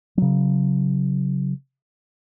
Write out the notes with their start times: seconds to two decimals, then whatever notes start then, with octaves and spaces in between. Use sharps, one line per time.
0.17 C#3 F#3